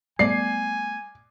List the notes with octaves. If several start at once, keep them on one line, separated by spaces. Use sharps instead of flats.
G3 A3 B3 D5 G#5 C7